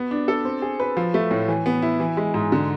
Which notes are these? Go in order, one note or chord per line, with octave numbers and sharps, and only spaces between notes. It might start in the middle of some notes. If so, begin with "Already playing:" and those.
Already playing: B3
D4
A4
C4
G#4
B4
F3
A3
A2
E3
B3
E4
E3
G#3
G#2
D3